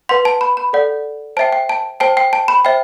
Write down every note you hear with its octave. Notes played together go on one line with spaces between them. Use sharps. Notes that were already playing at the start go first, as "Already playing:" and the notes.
B4 F#5 C6
A5
B5
B5
A4 D5 F#5
C5 E5 G5 A5
G5
A5
C5 G5 A5
G5
A5
B5
C5 E5 G5